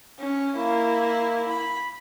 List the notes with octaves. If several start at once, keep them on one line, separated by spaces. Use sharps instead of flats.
C#4
A#3 E4
B5